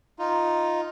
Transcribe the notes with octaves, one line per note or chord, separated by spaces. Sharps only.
D#4 F4